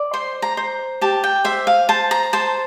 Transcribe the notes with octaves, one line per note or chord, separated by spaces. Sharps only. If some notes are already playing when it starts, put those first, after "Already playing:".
Already playing: D5
C5 C6
A#5
C5
G4 A5
G5
C5 E5
F5
C5 A5
A#5
C5 A5